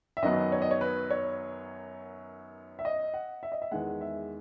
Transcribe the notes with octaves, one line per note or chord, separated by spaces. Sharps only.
E5
F#2 D#3 F#3 B3 D#5
C#5
D#5
C#5
B4
C#5
E5
D#5
F#5
E5
D#5
E5
E2 D#3 G#3 F#5
E5